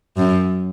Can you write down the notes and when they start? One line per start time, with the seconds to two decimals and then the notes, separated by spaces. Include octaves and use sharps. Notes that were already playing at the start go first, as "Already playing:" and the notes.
0.17 F#2